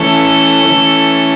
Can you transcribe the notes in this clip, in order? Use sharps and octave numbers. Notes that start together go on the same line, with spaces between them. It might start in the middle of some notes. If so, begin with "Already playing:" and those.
Already playing: E3 A3 C#4 A4
E3 A3 C#4